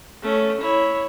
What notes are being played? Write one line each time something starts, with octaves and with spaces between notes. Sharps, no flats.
A3 C#4
E4 C#5